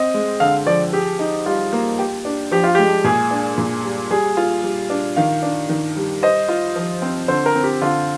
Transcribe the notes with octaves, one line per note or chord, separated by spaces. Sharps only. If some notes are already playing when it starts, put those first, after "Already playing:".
Already playing: C4 D#5
G#3
D3 F5
F3 D5
G4 G#4
D#4
G3 F4
A#3
G4
D4
F3 G4
F4
G#3 G4
A#2 G#4
D4
A#2
G3
G3 G#4
F4
G3
D4
D#3 F5
D4
D#3
G3
C5 D#5
F4
F3
C4
D3 C5
A#4
C4
G4
D3 F4